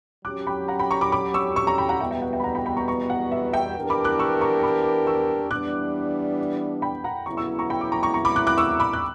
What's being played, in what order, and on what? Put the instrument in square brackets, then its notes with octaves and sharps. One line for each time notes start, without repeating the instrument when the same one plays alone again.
[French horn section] F#3 C#4 G4 [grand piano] D6 F#6
[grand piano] G5 B5
F#5 A#5
G5 B5
A#5 C#6
B5 D6
B5 D6
C#6 E6
C#6 E6
A#5 C#6
G5 B5
F#5 A#5
[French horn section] E2 B2 G3 B3 [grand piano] E5 G5
[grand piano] E5 G5
F#5
E5 G5
B5
F#5 A#5
G5 B5
G5 B5
A#5 C#6
A#5 C#6
F#5
E5
E5 G5
[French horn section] E3 B3 D4 G4 A#4
[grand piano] B5 D6
D6 F#6
C#6 E6
A#5 C#6
B5 D6
C#6 E6
[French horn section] E3 G3 B3 D4 [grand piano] D6 F#6
[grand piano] G5 B5
F#5 A#5
[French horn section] C#3 F#3 B3 E4 [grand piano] A#5 C#6
[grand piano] C#6 E6
A#5 C#6
G5 B5
D6
A#5 C#6
A#5 C#6
A#5 C#6
B5 D6
D6 F#6
D6 F#6
C#6 E6
B5 D6
F#6